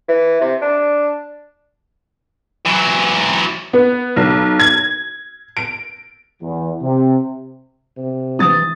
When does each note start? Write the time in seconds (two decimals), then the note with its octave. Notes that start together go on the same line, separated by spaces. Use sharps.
0.09 E3
0.41 C3
0.62 D4
2.66 E3 F#3
3.73 B3
4.16 B1
4.59 G#6
5.57 D7
6.41 E2
6.82 C3
7.97 C3
8.39 E3 D#6 A6